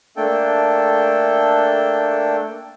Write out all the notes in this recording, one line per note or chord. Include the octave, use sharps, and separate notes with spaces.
A3 A#3 D4 A4 G5